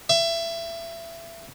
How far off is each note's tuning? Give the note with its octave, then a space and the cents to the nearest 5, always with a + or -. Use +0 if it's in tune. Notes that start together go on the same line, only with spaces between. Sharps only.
E5 +25